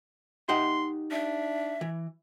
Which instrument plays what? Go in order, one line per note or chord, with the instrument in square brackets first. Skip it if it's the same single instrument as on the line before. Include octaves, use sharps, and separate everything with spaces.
[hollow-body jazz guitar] D#4 G4 F#5 [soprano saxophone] C6
[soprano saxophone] D4 [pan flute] E5
[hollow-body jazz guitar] E3